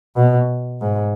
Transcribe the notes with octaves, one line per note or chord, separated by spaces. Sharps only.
B2
G#2